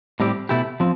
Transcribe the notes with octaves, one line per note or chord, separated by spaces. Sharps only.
A2 G3 C4 G4
B2 A3 E4 G4
F3 C4